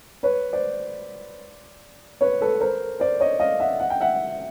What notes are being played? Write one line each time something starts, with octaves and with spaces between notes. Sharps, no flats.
B4 C#5
C5 D5
B4 C#5
A4 B4
A#4 C5
C5 D5
C#5 D#5
D#5 F5
E5 F#5
F#5
G5
E5 F#5